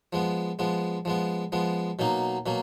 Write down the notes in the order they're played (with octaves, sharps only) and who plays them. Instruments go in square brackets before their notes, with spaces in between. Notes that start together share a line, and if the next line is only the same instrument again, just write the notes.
[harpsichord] F3 G#3 B3
F3 G#3 B3
F3 G#3 B3
F3 G#3 B3
B2 F#3 A#3 D#4
B2 F#3 A#3